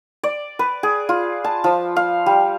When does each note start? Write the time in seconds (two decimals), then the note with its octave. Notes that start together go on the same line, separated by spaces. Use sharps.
0.23 D5
0.59 B4
0.83 G#4
1.09 F4
1.44 A5
1.64 F3
1.96 F5
2.26 G3